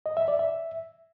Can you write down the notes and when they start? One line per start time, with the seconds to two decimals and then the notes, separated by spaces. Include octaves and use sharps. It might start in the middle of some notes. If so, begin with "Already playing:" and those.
0.06 D#5
0.17 E5
0.28 D5
0.39 E5